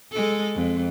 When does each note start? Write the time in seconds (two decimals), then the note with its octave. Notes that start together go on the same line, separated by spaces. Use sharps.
0.11 G#3 A4
0.55 F2